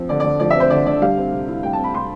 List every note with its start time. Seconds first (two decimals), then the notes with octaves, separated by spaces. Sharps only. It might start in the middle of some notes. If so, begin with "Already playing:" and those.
Already playing: F3 C4
0.09 D3 D5
0.20 D5
0.24 D3
0.40 F3 D5
0.50 E5
0.55 C4 C5
0.70 D3 D5
0.86 D3 D5
1.02 G3 F5
1.17 C4
1.32 C3
1.48 E4
1.63 G3 G5
1.73 A5
1.79 C4
1.84 B5
1.94 C3 C6